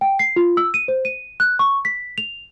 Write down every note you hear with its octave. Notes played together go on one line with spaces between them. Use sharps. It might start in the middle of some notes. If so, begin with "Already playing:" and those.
G5
C7
F4
E6
D#7
C5
D#7
F#6
C#6
B6
F7